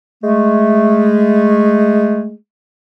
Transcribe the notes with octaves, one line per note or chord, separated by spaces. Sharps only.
G#3 A3